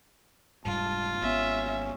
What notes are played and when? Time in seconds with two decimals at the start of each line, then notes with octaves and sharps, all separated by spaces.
0.65 F1 G#2 G3 F4 A5
1.22 G#1 B3 C#4 E5